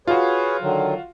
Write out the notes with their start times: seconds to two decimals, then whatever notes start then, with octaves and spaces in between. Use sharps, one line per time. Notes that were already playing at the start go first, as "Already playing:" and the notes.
0.07 F4 F#4 G#4 B4 C#5
0.61 D3 D#3 F#3